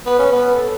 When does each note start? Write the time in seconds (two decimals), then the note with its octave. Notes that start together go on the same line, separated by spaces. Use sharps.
0.06 B3 B4
0.19 C#4
0.30 B3 B4
0.54 A4